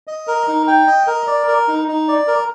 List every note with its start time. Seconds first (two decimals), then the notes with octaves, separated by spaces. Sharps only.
0.07 D#5
0.27 A#4
0.48 D#4
0.68 G5
0.87 D#5
1.07 A#4
1.27 D5
1.48 A#4
1.68 D#4
1.88 D#4
2.08 D5
2.27 A#4